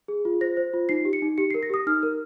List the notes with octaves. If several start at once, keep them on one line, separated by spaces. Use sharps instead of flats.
G#4
F4
C5 A#6
C5
F4
D#4 C7
G4
C#7
D#4
G4 C#7
A#4 C7
A#6
G4 D#6
D#4 F6
A#4